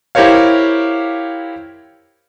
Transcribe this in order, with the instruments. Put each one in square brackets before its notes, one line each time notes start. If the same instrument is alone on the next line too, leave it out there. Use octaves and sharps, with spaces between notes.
[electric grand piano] E4 G4 A#4 C5 C#5 F5